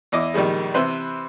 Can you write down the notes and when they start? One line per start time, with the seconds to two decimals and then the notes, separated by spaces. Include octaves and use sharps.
0.12 E2 E4 D#5 D6
0.34 A#1 D#3 G3 G#3
0.74 C3 E3 B4 C5 B5